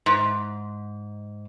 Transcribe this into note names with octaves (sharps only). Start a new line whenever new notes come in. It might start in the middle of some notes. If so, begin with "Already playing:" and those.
G#2